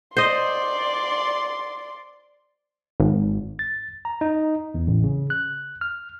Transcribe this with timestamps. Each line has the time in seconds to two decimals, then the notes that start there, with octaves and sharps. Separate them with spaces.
0.17 C5 D5 D#5 C6
3.00 G#1
3.59 A6
4.05 A#5
4.21 D#4
4.74 E2
4.87 A1
5.04 C#3
5.30 F#6
5.81 F6